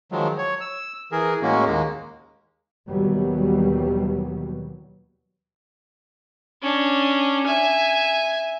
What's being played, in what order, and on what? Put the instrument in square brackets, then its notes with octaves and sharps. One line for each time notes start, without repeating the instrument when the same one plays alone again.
[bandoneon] D#3 F3 F#3 G#3
C#5
E6
E3 G#4 A#4
A2 G#3 A#3 C#4 F#4
D#2 G#3 A#3
[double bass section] D#2 B2 E3 F#3 G3 B3
[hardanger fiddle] C#4 D4
E5 G#5